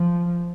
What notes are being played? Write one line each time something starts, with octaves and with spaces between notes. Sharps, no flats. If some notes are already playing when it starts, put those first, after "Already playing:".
Already playing: F3